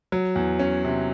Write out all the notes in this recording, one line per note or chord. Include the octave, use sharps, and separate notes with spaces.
F#3
E2
C#4
C3